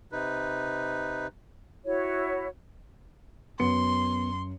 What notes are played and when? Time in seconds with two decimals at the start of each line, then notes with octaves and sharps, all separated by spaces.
0.12 C3 D#4 B4
1.85 E4 F#4 C#5
3.60 F#2 B3 C6 C#7